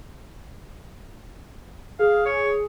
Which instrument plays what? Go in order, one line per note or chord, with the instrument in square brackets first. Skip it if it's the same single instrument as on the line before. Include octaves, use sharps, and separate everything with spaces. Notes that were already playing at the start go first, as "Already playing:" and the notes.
[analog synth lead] G#4 [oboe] F5
[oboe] C#5